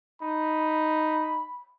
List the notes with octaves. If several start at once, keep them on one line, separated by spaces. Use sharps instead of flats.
D#4 B5